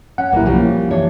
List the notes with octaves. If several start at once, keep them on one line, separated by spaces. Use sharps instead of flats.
C#4 F#5
B1 A#2 G3 A#3 E4
C#3 F3 G3 A#3
E3 D4 C#5